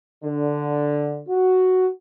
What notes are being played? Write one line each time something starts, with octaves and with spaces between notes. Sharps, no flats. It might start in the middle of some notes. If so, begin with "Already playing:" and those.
D3
F#4